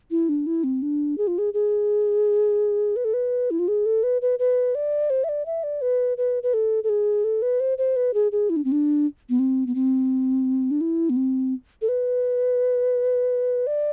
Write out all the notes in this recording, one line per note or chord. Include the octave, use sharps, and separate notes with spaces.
E4
D4
E4
C4
D4
G#4
F4
G#4
G#4
B4
A4
B4
E4
F4
G#4
A4
B4
B4
B4
D5
C5
E5
D5
E5
D5
B4
B4
B4
A4
A4
G#4
A4
B4
C5
C5
B4
G#4
G#4
E4
D4
C4
D4
B3
C4
B3
C4
D4
E4
B3
C4
A4
B4
D5